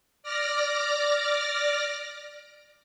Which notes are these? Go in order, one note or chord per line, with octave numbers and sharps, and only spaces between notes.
D5 D6 F6 A#6